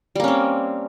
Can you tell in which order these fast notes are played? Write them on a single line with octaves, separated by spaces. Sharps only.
G3 A#3 C#4 C4